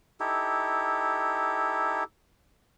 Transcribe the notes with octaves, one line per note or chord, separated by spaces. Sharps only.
D#4 E4 G4 A4